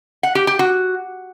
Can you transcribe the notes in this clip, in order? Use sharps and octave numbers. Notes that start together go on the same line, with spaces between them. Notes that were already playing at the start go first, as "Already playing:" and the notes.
F#5
G4
G4
F#4